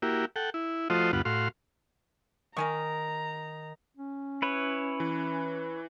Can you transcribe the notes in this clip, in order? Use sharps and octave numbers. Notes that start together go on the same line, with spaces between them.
A#3 E4 F#4 G4
A4 F#5 G5
E4
F3 A3 F4 F#4 C5 D#5
D2 G2 B3 F4 F#5
A2 F#4 F5 C6
D#3 A#4 G#5 A#5 C#6
C#4
E4 B4 C#5
E3